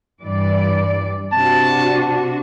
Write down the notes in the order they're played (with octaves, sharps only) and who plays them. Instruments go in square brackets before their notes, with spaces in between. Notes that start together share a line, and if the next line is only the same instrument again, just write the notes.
[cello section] G2 E3 D5
[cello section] C3 D4 F#4 [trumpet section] A5